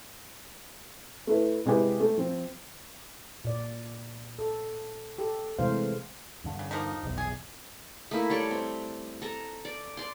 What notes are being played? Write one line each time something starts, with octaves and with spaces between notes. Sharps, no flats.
A3 E4 B4
C3 G#3 E4 G4 B4
A3
F3 C4
A#2 D5
A4
G4 A4
C3 E3 G#3 A3 C5 F5
E2 G2 D3
C#3
F3 A#3 D#4
F1 B1 E2
G#4
A3 A#3 E4
G3 A4 C#5 D5
C4
A4 A#5
D5
D5 C6